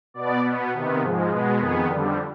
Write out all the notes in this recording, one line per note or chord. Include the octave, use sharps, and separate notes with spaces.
B2 B3 D5
B2 B3
C3 D#3 B3
G#2 F3 G#3
B2 G#3 B3 B4
F2 D#3 B3 G#4
F2 D3 G3